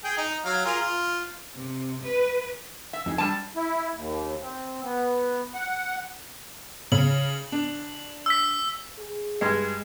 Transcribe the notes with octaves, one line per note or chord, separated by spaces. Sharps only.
G#4 G5
D#4
F#3 F5
F4 G#4 A#4
F4
C3
B4
E5
F2 D#4 G#4
G3 D4 A5
E4
D#2
C4
B3
F#5
C#3 F#7
D4
E6 B6
G#4
G2 G#3